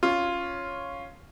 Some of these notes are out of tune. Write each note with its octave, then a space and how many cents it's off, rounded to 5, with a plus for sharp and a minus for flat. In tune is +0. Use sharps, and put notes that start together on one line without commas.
C#4 +0 F4 +0